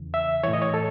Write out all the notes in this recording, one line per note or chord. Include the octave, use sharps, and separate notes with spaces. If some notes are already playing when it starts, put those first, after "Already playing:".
Already playing: E2 C#3 E3
E5
A2 E3 C#5
D#5
C#5
A4